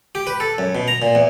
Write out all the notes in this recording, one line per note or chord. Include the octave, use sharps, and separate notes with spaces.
G4
B4
A4
F#2
B2
A#5
A#2
E2